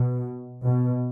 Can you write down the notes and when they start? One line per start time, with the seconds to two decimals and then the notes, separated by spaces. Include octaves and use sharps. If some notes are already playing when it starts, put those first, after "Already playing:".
Already playing: B2
0.66 B2